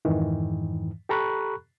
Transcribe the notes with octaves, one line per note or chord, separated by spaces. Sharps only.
F2 G#2 D#3 E3
G4 A4 A#5 B5 C#6 F#6